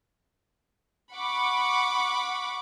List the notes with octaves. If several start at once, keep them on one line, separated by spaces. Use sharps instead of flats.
F#5 B5 C#6 D6